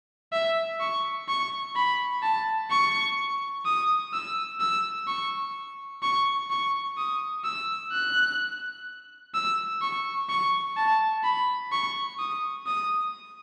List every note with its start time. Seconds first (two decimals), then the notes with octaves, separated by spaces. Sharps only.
0.33 E5
0.80 C#6
1.28 C#6
1.76 B5
2.23 A5
2.70 C#6
3.65 D#6
4.13 E6
4.60 E6
5.08 C#6
6.03 C#6
6.50 C#6
6.97 D#6
7.44 E6
7.92 F#6
9.34 E6
9.81 C#6
10.29 C#6
10.77 A5
11.24 B5
11.72 C#6
12.19 D#6
12.67 D#6